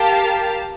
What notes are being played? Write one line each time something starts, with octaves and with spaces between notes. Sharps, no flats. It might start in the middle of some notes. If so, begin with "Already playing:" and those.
Already playing: G4 A#4 F5 A5